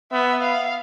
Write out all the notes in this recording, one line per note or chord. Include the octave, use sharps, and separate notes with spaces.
B3 E5
F5